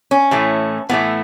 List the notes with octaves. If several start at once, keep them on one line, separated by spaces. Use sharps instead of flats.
C#4
A2 E3 A3
A2 E3 A3 B3